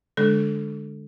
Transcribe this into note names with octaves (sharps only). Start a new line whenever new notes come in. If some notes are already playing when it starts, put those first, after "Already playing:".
D3 G#3 D4 A4